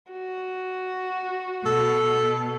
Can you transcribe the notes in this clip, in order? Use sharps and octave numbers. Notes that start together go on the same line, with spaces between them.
F#4
B2 A4